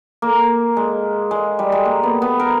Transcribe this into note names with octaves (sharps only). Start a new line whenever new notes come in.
A#3
G#3
G#3
G3
G#3
A#3
B3
B3
A#4